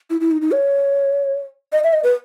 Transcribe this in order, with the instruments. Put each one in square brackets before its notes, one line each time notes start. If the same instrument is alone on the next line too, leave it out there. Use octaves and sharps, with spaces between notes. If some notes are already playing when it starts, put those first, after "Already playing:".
[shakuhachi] E4
E4
D#4
D#4
C#5
D#5
E5
D#5
B4